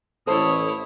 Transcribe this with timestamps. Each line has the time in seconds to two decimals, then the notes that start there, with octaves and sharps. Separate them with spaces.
0.27 A1 E4 A4 C5 C#5 C6 D#6